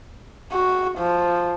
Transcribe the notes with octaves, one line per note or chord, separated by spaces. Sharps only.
F#4
F3